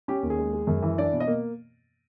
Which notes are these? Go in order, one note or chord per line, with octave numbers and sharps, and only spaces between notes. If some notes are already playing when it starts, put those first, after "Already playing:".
C#4 G4
D#2
G#4
G#3
G#3
F#2
E3
D4 D5
B2
D#5
A#3